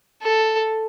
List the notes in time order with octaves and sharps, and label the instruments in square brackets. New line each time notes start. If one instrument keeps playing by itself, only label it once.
[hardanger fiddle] A4